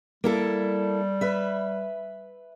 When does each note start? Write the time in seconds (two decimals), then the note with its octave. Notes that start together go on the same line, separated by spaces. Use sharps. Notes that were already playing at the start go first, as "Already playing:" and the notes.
0.24 G3 A#3 E4 A4
1.21 B4 E5